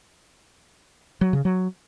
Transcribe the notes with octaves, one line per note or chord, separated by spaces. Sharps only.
F#3
C#3
F#3